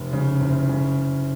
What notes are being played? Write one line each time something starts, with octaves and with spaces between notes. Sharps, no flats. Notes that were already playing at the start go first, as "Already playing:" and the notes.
Already playing: F1
C#3
F#1
C#3